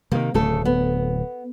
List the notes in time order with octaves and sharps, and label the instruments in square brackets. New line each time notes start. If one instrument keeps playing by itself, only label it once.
[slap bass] C3 D#3 [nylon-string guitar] A#3
[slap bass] D1 [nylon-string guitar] C#3 A3 A4
[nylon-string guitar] B3